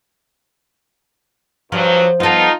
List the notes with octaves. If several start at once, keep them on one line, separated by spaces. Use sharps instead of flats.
G2 F3 F#3
B3 D#4 F4 A4